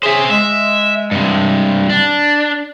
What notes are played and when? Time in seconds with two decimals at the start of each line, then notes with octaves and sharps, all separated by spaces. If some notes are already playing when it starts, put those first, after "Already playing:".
0.03 G#4 C5 C#5 E5
0.31 G#3 E5
1.11 G2 C3
1.89 D4